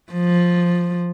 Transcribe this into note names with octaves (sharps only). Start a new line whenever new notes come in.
F3